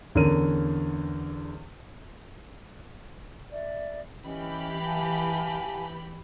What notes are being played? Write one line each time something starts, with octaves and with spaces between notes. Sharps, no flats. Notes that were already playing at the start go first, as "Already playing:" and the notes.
E2 D3 C#4 A#4 D#7
D5 E5
E3 C#4 G4 D#5 B5
F5 G#5 A5